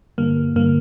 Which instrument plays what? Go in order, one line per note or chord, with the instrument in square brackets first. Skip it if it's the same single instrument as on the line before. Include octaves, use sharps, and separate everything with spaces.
[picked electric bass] G2 D3 G3 [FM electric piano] A#3
[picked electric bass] G2 D3 G3 [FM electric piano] A#3